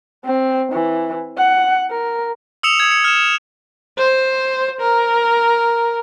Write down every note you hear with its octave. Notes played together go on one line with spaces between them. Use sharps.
C4
E3
F#5
A#4
D#6 E6 C#7 E7 F7
D#6 G#6
C#7
F6 E7
E7
C5
A#4